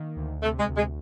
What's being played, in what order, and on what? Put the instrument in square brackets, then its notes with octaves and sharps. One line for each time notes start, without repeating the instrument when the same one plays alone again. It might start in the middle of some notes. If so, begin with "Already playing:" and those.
Already playing: [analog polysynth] D#3 A#3
D2
[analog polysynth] C3 [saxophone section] A3
[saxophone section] G#3
[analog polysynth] D2
[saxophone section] G#3